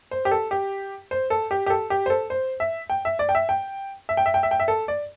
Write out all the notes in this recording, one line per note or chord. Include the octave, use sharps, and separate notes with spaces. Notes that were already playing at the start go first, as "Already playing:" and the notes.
C5
G4
A4
G4
C5
A4
G4
G4
A4
G4
C5
A4
C5
E5
G5
E5
D5
G5
E5
G5
E5
G5
E5
G5
E5
G5
E5
A4
D5